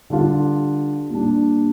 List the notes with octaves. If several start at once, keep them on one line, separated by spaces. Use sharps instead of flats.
D3 G3 D4 F4
A#2 G3 D4